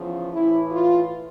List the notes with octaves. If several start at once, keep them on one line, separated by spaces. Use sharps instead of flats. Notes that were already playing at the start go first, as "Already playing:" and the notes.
Already playing: E2 C#3 F3
A2 E3 E4
F4